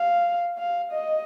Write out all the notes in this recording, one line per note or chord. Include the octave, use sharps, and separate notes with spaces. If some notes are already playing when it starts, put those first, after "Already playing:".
Already playing: F5
F5
D#5